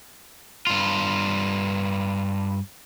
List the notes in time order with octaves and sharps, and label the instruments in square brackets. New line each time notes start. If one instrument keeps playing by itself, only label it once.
[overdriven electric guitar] G2 F4